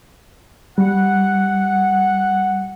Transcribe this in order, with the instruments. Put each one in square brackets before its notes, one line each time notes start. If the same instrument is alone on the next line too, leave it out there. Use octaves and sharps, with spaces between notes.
[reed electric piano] G3 [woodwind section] F#5